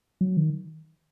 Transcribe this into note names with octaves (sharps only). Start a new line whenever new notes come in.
F#3
D#3